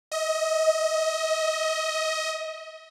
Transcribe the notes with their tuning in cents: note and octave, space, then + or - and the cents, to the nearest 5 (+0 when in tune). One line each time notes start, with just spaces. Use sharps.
D#5 +25